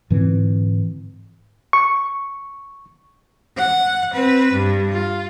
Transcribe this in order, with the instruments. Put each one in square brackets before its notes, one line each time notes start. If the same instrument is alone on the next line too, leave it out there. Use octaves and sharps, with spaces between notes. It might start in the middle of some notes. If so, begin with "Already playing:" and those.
[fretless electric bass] G#2 D3 E3 C4
[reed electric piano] C#6
[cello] F#5
C4 B4
G2
F4